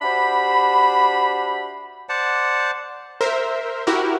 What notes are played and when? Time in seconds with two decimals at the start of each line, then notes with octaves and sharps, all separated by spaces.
0.02 D4 F#4 G4 C5 E5 B5
2.09 C5 D5 F#5 A5
3.21 A#4 C5 E5
3.87 E4 F#4 G4 A#4